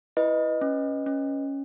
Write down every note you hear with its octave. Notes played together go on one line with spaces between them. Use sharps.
E4 B4 D#5
C#4
C#4